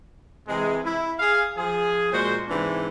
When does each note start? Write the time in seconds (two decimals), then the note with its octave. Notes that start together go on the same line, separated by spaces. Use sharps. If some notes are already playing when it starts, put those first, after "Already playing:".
0.48 C3 E3 G#3
0.84 E4
1.19 G#4 F5
1.57 F3 G#4
2.13 A#2 G#3 F#4 C5
2.49 G#2 C3 E3 G#3 D4